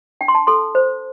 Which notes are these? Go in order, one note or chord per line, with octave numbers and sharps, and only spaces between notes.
D4 G5
C6
A5
A4 C6
C5